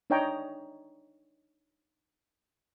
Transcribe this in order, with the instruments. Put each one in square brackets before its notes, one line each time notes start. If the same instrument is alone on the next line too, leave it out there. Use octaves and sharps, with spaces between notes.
[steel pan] D4 D#4 C#5 D#5 G5 A#5